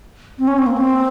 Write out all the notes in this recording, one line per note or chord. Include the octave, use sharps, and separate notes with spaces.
C4
C#4
C4
A#3
C4